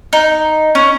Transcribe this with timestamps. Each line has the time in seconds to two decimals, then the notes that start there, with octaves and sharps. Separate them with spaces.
0.13 D#4
0.75 C#4